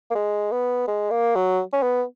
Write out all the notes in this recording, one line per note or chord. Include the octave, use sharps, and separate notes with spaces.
A#3
G#3
B3
G#3
A#3
F#3
C#4
B3